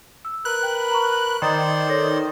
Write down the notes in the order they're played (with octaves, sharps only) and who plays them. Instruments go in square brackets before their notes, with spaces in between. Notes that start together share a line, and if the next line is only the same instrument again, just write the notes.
[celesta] E6
[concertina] A#4 B4 B5 [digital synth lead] F#6
[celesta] G5
A#5 C#6
[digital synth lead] D#3 [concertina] C5 D5 C6 [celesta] A#5 D#6 A6
[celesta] A4 C#5 A#6